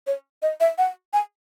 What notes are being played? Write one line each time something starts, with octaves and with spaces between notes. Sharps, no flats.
C#5
D#5
E5
F#5
G#5